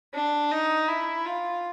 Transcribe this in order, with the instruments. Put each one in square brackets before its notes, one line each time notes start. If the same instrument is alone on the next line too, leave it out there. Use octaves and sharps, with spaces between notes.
[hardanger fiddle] D4
D#4
E4
F4